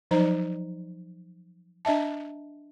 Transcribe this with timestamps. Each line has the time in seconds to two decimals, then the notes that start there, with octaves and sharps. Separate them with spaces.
0.11 F3 F#3 D#4 C5 D#5 A#5
1.85 D4 D#5 E5 A5